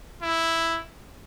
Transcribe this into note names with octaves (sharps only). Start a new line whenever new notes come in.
E4